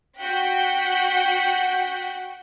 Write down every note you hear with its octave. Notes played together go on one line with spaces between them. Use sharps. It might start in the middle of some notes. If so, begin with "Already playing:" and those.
F#4 F#5 G5 F#6 G6 B6